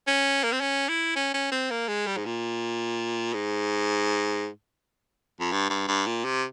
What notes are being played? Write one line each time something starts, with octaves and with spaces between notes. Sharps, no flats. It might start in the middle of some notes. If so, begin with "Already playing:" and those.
C#4
A#3
C4
C#4
E4
C#4
C#4
C4
A#3
G#3
G3
G#2
A#2
G#2
F2
G2
G2
G2
A#2
C3